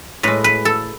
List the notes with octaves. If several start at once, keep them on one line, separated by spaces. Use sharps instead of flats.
A2 G#3 B4
B4
A4